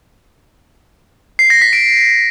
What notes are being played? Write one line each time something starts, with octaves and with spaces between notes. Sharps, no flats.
C7
A#6
B6
D7